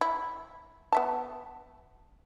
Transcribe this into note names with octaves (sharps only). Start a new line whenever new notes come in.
E4
B3 E5 A5